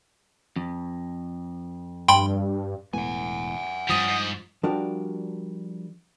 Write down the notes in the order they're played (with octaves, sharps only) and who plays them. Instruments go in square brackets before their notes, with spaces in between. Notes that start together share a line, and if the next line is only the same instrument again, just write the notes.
[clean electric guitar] F2
[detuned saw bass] G2 [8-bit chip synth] G5 B5 C6
[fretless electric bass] E1 A2 B3 [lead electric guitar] F#5 G#5
[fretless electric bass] G2 F3 [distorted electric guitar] G3 C#4 [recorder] D#6
[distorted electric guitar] G#2
[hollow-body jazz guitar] F3 G3 D4 F#4 A#4 D5